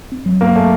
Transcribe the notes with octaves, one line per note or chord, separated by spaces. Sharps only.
C4
F#3
G2 A#3
A3